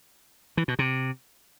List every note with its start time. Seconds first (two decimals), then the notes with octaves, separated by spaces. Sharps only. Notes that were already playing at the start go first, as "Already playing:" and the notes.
0.57 E3
0.68 B2
0.79 C3